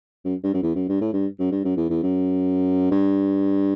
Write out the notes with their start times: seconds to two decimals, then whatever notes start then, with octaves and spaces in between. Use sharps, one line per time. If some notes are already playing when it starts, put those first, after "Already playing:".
0.25 F#2
0.43 G2
0.54 F#2
0.63 E2
0.75 F#2
0.89 G2
1.01 A2
1.13 G2
1.39 F#2
1.52 G2
1.65 F#2
1.77 E2
1.90 E2
2.03 F#2
2.91 G2